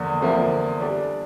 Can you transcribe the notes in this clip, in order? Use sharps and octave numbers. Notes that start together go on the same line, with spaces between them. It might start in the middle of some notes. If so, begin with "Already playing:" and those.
Already playing: E2 D3 F3 A#3
E2 D3 F3 A#3 E4
G3 D4 A4 D5